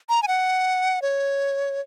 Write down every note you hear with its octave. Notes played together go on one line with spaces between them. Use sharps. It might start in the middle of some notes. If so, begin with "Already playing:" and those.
A#5
G#5
F#5
C#5